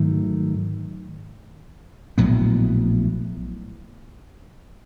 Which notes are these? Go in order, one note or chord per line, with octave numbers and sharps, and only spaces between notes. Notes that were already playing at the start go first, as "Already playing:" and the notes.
Already playing: G#2 D#3 F#3 A3
A#1 A2 F#3 B3